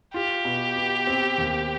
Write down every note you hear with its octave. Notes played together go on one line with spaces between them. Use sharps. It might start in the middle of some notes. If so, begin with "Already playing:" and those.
F4 G4
B2
B3
C4
D#2